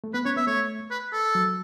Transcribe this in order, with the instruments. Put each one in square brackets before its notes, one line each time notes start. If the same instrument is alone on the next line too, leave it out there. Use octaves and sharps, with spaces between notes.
[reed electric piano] A3
[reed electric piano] B3 [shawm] B4
[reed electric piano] C#4 [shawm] C#5
[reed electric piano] B3 [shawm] E5
[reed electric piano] A3 [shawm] C#5
[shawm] B4
A4
[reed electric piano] F#3